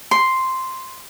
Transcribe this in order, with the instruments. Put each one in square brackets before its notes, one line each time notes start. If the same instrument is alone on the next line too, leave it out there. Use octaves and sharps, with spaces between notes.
[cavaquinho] C6